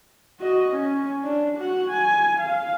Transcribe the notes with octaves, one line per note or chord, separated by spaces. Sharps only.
F#4 D#5
C#4
D4
F#4 F#5
G#5
F5